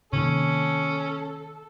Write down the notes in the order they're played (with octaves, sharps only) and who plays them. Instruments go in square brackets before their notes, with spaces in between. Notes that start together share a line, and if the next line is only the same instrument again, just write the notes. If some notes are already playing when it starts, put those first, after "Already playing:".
[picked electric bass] C3 D#3 A#3 [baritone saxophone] C#4 [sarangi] A4